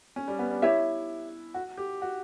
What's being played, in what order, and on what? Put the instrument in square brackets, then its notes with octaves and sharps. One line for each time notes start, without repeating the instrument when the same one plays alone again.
[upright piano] C#4
G3
B3
D4
[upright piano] E4 [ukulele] G4 C#5 E5
[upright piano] F#4
G4
F#4